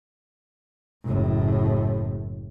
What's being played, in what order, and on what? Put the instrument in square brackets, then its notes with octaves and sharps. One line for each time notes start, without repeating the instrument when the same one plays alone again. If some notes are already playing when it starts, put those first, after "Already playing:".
[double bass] F#1 A2